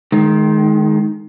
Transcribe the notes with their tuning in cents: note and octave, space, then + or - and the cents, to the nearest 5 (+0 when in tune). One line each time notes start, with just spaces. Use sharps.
D#3 +0 G#3 +30